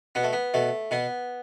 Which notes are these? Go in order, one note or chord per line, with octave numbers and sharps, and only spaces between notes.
B2 B3
A3
B3
B2 A3
B2 B3